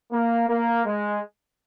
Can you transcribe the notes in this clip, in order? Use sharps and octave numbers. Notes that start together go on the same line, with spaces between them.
A#3
A#3
G#3